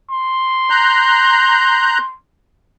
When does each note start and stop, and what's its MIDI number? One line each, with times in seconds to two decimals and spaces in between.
0.11 2.15 84
0.70 1.98 82
0.70 1.98 90
0.70 1.98 91